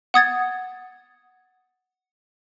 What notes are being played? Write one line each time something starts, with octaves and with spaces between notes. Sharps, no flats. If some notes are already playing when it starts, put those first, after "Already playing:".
F#5 D#6 G#6 A6